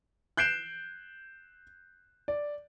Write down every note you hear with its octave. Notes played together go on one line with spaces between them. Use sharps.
F#6 G6 C7 D7 E7
D5